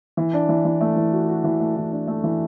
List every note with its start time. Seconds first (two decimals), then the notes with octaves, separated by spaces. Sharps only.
0.17 E3
0.33 D4
0.49 E3
0.65 E3
0.81 A3
0.96 E3
1.13 F#4
1.28 F#4
1.44 E3
1.60 A3
1.76 E3
1.92 D4
2.08 A3
2.24 E3